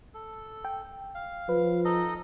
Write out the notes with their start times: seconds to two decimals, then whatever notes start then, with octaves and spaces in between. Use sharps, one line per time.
0.14 A4
0.65 G5
1.15 F5
1.49 F3 B4
1.85 D#4 A4 D#5